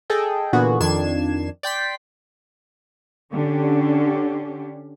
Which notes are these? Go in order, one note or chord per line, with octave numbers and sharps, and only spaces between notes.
G#4 A4 D#5 G5
A#2 D3 E3 B3 F#4 G#4
F2 D#3 D4 G#6 C7 E7
D5 G5 C6 B6
D3 C#4 D4 G4